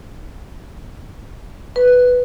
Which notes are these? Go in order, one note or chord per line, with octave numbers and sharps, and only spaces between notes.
B4